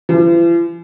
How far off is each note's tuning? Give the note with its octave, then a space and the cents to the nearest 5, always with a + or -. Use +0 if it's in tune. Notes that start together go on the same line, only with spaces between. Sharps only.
E3 +45